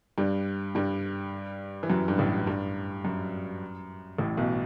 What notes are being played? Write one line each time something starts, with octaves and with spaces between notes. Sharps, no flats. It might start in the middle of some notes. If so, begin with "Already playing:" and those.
G2 G3
G2 G3
E3
F#2 F#3
G2
A1 A2
G2
F#2
A1 A2
B1 B2